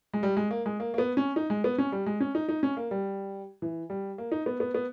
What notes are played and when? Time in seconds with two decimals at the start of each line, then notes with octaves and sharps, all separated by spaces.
0.13 G#3
0.23 G3
0.37 G#3
0.51 A#3
0.66 G#3
0.80 A#3
0.94 A#3
0.98 B3
1.17 C#4
1.36 D#4
1.50 G#3
1.64 B3
1.78 C#4
1.92 G3
2.06 G#3
2.20 C#4
2.35 D#4
2.49 D#4
2.63 C#4
2.77 A#3
2.91 G3
3.62 E3
3.90 G3
4.18 A#3
4.32 D#4
4.46 B3
4.60 B3
4.75 B3